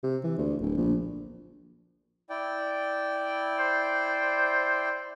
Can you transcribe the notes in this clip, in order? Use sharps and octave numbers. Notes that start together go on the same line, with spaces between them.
C3
E3
D2
D1
A#1
E4 D5 G5
C5